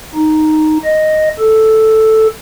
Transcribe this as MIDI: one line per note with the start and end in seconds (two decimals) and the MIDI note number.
0.14 0.77 63
0.84 1.29 75
1.39 2.27 69